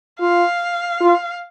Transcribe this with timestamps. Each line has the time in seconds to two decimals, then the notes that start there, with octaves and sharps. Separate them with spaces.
0.20 F4 F5
1.01 F4